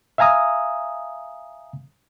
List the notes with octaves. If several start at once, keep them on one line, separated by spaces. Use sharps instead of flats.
E5 F5 G#5 A#5 D#6